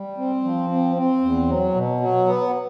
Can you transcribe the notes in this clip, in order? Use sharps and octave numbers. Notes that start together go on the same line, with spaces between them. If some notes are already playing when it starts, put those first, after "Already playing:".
Already playing: G3
C4
F3
C4
C4
E2
F#3
B2
F#3
B3